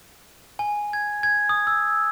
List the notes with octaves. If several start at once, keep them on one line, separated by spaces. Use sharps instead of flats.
G#5
G#6
G#6
D#6
E6